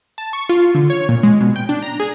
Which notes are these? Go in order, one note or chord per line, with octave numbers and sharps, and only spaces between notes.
A5
C#6
F4
D3
C#5
A#2
G#3
B2
G5
D4
A#5
G#4